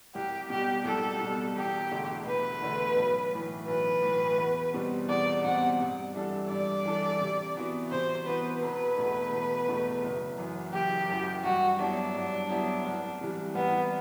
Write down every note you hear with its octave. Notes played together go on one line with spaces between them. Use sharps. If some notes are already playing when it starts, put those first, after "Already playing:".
C2 G4
B2 G3 G4
C2 A4
B2 G3
E1 G4
E2 D3 A3
E1 B4
E2 D3 A3
B1
A2 E3
B1 B4
A2 E3
E2
B2 G3 C4
E2 D5
B2 G3 C4 F#5
G2
E3 G3 D4 A4
G2 D5
E3 G3 D4 A4
C3
E3 B3 F#4
C3 C5
E3 B3 F#4 B4
E1 B4
E2 B2 A3
E1
E2 B2 A3
F#1
F#2 E3
F#1 G4
F#2 E3
G2 F#4
F#3 B3 D4 E4 G4
G2
F#3 B3 E4 G4
C2
C3 E3 G3
C2 B3